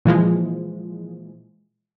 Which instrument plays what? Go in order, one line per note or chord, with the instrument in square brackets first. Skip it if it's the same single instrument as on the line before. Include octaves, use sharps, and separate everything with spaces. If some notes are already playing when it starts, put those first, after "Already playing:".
[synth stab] A#2 E3 F3 G#3